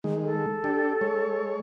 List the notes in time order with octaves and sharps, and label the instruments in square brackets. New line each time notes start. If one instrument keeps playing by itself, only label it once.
[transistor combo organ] D#3 G#3
[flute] A4
[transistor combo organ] D4 G4
G#3 C#5